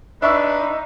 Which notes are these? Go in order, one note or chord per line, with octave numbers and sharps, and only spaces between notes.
D4 D#4 B4 E5 C#6 E6